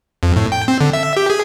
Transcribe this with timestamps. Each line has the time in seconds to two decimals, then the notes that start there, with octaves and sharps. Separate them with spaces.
0.23 F2
0.36 A2
0.52 G5
0.68 C4
0.81 D3
0.93 E5
1.17 G4
1.30 G#4